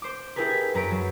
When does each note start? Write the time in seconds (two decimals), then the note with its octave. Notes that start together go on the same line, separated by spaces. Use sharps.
0.02 C5 D6
0.36 E4 G4 G#4 A#4 B4
0.49 G#6 B6
0.74 F#2 B4 A#5 A#6 D7
0.91 F#3